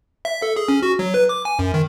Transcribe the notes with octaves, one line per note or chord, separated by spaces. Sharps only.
E5
A4
G#4
C#4
F#4
F#3
B4
D6
G#5
F#2
D#3